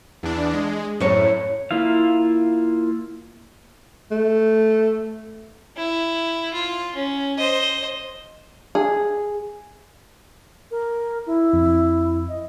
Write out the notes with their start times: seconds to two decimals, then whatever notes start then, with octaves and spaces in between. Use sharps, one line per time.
0.23 E2 D4
0.53 G#3
1.00 F#2 A2 C#5
1.71 A#3 E4 F4 F5
4.12 A3
5.77 E4
6.53 F4
6.95 C#4
7.38 C5 D#5
8.75 G#4
10.71 A#4
11.26 E4
11.53 F2
12.28 D#5